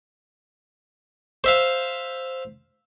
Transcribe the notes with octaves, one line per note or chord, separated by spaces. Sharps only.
C5 E5 F5